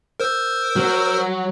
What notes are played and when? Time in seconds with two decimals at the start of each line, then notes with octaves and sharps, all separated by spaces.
0.20 A#4 C5 E6
0.76 F#3